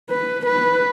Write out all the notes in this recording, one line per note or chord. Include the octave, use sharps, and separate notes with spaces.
B4
B4